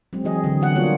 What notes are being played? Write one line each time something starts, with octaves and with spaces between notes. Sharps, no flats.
F#3 G#3 C4
E3 G#4 D#5
D3 F#3
D3 B3 F#5
G3 A#3 D4 F4 F#4 C#5